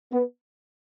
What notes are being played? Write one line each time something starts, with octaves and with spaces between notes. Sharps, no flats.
B3